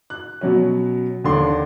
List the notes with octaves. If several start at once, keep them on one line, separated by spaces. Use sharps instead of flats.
F#6
B2 F#3 C#4
D#2 D3 D4 C6